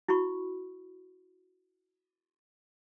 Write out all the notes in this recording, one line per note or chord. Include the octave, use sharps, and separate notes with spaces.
E4 F#4 B5 C#6